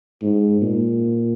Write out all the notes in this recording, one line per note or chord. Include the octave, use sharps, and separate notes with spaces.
G#2
A#2